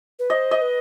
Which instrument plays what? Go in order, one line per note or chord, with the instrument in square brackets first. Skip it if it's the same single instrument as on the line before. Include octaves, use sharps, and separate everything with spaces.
[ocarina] B4
[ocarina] C5 [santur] D#5
[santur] D#5
[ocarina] B4